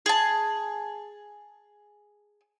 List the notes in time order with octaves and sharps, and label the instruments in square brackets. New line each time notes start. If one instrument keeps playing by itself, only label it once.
[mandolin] G#4 A5